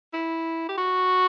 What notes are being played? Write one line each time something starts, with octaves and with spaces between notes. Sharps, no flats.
E4
G4
F#4